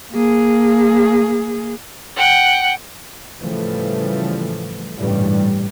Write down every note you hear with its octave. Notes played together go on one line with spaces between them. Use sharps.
A#3 G#4
F#5 G5
A2 C#3 E3 F3 G3 A3
A1 G2 A#2 C#3 E3 G3